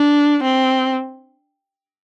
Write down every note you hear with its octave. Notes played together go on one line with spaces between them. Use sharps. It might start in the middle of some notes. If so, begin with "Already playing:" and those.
Already playing: D4
C4